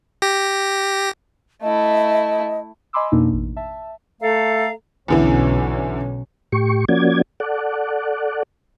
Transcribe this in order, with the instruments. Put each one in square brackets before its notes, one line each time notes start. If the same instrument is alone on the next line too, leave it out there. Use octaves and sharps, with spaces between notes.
[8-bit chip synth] G4 A#6
[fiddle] A3 E4 [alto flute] D#5
[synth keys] D#5 G#5 B5 C6 D6 E6
F2 B2 A#3 D4 D#4
A1
E5 A5
[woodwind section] A3 A4 [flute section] F5 A#5
[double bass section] B1 C#4 [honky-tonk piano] E2 D3 E3
[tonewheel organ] A2 G4 C#6
F3 A#3 C#4 F#4 D5 G#6
A4 D5 F#5